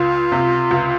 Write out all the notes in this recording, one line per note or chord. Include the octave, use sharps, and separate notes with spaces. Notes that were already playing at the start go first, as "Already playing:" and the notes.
Already playing: C#2 F4
C3
C#2